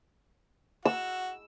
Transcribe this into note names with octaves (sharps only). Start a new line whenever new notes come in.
F#4 E6